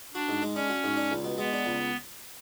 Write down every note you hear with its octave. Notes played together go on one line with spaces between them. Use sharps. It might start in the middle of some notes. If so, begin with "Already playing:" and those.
D4 F#4
G#2
G#3
C#4 D4
F#4
G#2
D4
C#2
B2
G#3 B3
D4
C#2